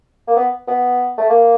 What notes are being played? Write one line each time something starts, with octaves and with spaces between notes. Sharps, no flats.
A#3
B3
B3
A3
A#3